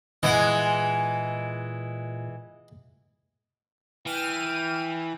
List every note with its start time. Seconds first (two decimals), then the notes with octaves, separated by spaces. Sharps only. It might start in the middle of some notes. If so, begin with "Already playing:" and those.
0.23 A#2 E3 G#3 D#5 F#5
4.07 E3 G5 F6 D#7